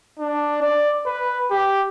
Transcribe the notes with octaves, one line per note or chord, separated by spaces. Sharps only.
D4
D5
B4
G4